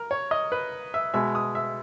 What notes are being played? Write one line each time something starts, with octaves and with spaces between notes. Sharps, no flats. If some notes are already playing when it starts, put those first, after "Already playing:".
Already playing: A#4
C#5
D#5
B4
E5
B2 G#3 E5
D#6
E5